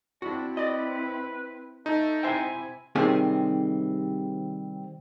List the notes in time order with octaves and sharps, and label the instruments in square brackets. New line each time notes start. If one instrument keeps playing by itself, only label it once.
[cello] C4 E4 [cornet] D4 [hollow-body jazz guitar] F#4
[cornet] B4 [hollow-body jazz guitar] D5 D#5
[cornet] A3 [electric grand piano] D#4
[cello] C3 E4 [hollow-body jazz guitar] C5 E5 G5 [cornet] G#5
[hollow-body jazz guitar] C3 D#3 G3 C4 G#4